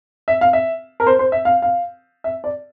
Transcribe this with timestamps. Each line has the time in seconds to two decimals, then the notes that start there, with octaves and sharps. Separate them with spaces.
0.28 E5
0.41 F5
0.53 E5
1.00 A#4
1.07 C5
1.19 C5
1.32 E5
1.45 F5
1.62 F5
2.24 E5
2.44 D5